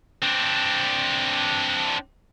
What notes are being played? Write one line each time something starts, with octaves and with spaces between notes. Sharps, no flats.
C4 D4